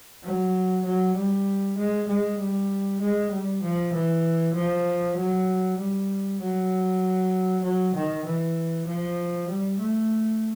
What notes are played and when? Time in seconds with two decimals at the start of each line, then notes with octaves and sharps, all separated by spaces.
0.23 F#3
0.85 F#3
1.15 G3
1.77 G#3
2.08 G#3
2.39 G3
3.00 G#3
3.31 G3
3.62 F3
3.93 E3
4.54 F3
5.16 F#3
5.77 G3
6.40 F#3
7.63 F#3
7.94 D#3
8.25 E3
8.86 F3
9.49 G3
9.79 A3